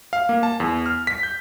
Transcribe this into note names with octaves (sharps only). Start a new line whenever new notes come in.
F5
A#3
A5
E2
F6
B6
G6